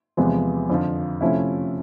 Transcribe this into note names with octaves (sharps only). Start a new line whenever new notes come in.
E2 C3 F3 G#3 B3
F2 D3 F3
C3 F3 A3 C#4 E4